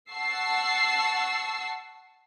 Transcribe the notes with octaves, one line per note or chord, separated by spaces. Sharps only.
F#5 A5 C#6 E6 C7